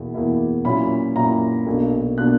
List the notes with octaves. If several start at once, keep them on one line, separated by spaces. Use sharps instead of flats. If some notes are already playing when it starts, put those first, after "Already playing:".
Already playing: E2 B2 A#3 E4
E2 B2 A#3 E4
A#2 F#3 C#4 E4 B5
A#2 F#3 C#4 E4 A#5
B1 B2 A#3 D4
B2 A#3 D4 F#6